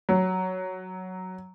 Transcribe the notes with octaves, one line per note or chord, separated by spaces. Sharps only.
F#3